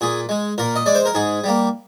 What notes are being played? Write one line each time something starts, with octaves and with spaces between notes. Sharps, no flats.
A#2 G#4
G#3
A#2 A#4
D#5
G#3 D5
C5
A#4
G#2 G#4
G3 A#3